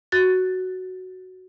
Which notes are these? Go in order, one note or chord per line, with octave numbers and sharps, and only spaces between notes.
F#4 A6